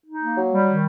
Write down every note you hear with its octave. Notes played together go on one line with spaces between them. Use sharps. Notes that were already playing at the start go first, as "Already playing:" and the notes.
D#4
A#3
F#3
G3
D#3